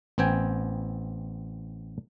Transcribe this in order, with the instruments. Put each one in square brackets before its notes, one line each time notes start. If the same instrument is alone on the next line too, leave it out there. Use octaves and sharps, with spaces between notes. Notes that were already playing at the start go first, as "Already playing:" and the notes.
[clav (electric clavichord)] A1 B3 C4 G5 G#5